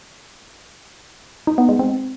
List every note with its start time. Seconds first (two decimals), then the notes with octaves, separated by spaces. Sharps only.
1.47 D#4
1.58 B3
1.69 G#3
1.79 C4